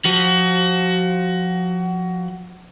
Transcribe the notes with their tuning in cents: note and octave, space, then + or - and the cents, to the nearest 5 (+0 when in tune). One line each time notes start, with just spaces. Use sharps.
F3 +30 F#4 +25